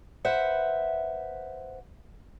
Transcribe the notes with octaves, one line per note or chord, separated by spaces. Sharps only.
B4 C5 E5 F#5